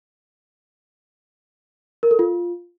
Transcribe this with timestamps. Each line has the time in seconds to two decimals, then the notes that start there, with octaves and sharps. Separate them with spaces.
2.03 A#4
2.11 A4
2.19 F4